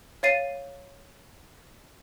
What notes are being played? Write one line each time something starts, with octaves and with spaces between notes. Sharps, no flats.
C#5 F5 A6 C7 D#7